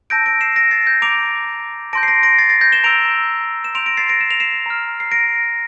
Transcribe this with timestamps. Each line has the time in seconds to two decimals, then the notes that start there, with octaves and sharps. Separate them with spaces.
0.10 A5 E6 G6 A#6 D7
0.26 A#6 D7
0.41 C7 E7
0.56 A#6 D7
0.71 A6 C7
0.86 G6 A#6
1.02 A#5 D6 G6 D7 F7
1.93 A5 C6 G6 A#6 D7
2.03 C7
2.08 A#6 D7
2.23 A#6 D7
2.38 A6 C7
2.50 A6 C7
2.61 G6 A#6
2.72 E7 G7
2.84 A#5 E6 G6 D7 F7
3.64 E7
3.75 C6 G6 D7 F7
3.86 A#6 D7
3.97 A6 C7
4.09 A#6 D7
4.21 E7
4.31 F7
4.40 C7 E7
4.66 A#5 F6
5.00 C7
5.11 A#6 D7